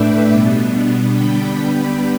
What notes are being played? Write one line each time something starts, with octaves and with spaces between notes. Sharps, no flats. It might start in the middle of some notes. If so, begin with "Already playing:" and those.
Already playing: A2 A3 D4 B4 D5 E5 G5
B2 G3 B3 D4
D3 G3 B3 D4 G5 B5